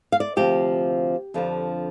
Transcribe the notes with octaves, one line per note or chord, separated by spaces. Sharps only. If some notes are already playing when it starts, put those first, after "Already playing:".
F5
D5
D2 C3 F3 C4 G4
F2 D3 F3 D4